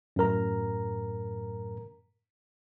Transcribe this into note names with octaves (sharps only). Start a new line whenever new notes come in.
F#2 A2 A#4 A#5